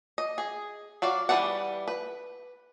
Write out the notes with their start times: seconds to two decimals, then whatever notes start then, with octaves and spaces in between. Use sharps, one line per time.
0.18 D#5
0.38 G#4
1.02 F#3 F#4 D5 F5
1.29 E3 G3 F#4 D5 F#5
1.88 B4